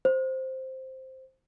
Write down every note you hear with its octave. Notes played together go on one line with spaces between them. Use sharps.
C5